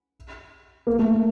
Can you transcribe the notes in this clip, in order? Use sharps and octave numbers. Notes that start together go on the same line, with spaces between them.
A#3
A3